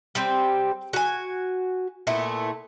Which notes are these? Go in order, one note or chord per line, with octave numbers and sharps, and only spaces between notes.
G3 C4 C5
F#4 G#5
A#2 A3 B3 E4